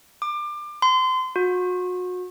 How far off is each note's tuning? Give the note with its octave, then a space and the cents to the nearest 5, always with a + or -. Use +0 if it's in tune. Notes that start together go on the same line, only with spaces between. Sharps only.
D6 +25
C6 -30
F#4 -35